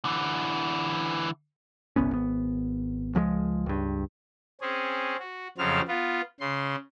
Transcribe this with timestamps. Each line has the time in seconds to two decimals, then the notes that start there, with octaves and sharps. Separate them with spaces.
0.05 D3 E3
1.96 G1 C2 B3 C#4
2.11 G#1 B3
3.15 C#2 F3 F#3 G#3
3.66 C#2 G2
4.61 C4 C#4 G#4
5.20 F#4
5.58 F2 C#3 F3 F#3 C4 F6
5.88 B3 F4
6.40 C#3 C6